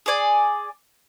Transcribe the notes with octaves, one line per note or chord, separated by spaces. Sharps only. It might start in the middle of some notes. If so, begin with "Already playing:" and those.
G#4 D5 G#5